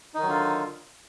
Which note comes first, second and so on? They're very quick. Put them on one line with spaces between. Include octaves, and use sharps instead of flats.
D#4 D#3 F#3 D3 F4